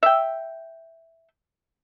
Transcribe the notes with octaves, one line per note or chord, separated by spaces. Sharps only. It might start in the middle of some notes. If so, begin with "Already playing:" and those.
E5 G5